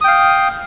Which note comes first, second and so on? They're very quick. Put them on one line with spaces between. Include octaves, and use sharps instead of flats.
D#6 G5 F5